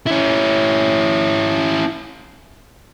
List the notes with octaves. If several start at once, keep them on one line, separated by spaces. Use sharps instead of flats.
C#4 E4